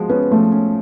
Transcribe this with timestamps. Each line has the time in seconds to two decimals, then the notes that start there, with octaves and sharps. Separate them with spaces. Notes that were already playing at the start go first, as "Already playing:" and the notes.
Already playing: F3 G#3 F#4
0.09 B3 C#4
0.32 F3 A3
0.52 C#4